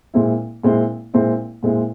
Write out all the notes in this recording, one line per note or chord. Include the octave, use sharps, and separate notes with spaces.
A#2 G#3 C4 E4
A#2 G#3 C4 E4
A#2 G#3 C4 E4
A#2 G#3 C4 E4